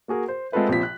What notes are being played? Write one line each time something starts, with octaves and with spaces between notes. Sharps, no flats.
A#3 F#4 G#4 A#4
C5
G#3 C4 F4 A4 B4 E5
A#1 C3 F3 B6
F#6